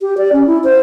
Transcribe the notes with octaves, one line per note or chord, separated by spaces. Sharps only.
G4
D5
C#4
E4
C5